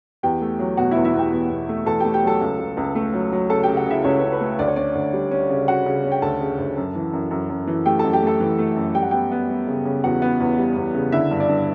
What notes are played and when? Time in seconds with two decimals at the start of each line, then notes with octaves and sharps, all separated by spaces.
0.23 E2 G4 G5
0.42 A3
0.59 F#3
0.77 B2 F#4 F#5
0.91 E2 E4 E5
1.05 E4 E5
1.14 E2 G4 G5
1.32 E2
1.51 B2
1.69 A3
1.86 E2 A4 A5
2.00 A3 G4 G5
2.14 G4 G5
2.23 F#3 A4 A5
2.41 C#2
2.59 C#2
2.77 C#2
2.95 A3
3.13 F#3
3.32 F#3
3.50 C#3 A4 A5
3.63 C#3 G4 G5
3.77 F#4 F#5
3.86 C#3 E4 E5
4.04 C#2 C#4 C#5
4.18 C#2 B4
4.32 B4
4.41 A3
4.59 D2 D5
4.68 C#5
4.76 C#4 D4 D5
4.95 D2
5.13 G3
5.31 C#4
5.50 C#3
5.68 C#4 F#4 F#5
5.86 C#3
6.04 C#4
6.12 G5
6.22 D2 A4 A5
6.41 C#3
6.59 D2
6.77 F#2
6.95 E3
7.13 F#2
7.31 F#2
7.50 F#2
7.67 E3
7.86 A3 G4 G5
7.99 F#2 A4 A5
8.13 G4 G5
8.22 A3 A4 A5
8.40 E3
8.59 A3
8.77 F#2
8.95 G3 G5
9.03 F#5
9.11 B3 G4 G5
9.32 B3
9.49 G3
9.67 C#3
9.85 C#3
10.04 E2 F#4 F#5
10.22 B3
10.40 E2
10.58 G3
10.76 E2
10.95 C#3
11.12 D3 E4 E5
11.31 G2
11.40 D4 D5
11.49 G2